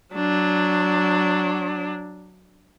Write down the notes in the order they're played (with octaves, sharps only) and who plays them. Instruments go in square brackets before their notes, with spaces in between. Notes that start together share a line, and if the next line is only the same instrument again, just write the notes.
[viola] F#3 D4